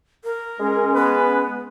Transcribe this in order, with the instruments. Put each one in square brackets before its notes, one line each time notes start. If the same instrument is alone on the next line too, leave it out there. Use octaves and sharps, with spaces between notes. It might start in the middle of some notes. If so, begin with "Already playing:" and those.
[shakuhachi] A#4
[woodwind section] G#3 C#4
[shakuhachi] B3 [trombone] B4